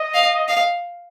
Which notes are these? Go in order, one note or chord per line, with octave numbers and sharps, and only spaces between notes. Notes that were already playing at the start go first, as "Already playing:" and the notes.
Already playing: D#5
F5
F5